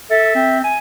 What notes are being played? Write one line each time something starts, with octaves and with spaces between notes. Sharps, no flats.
A4 E5
C4
G#5